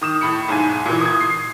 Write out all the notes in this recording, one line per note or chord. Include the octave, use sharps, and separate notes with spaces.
D#3 D#6 E7
A2 B5 C#7
B1 G#2 G#5
A#2 E3
D#6 G#6
C7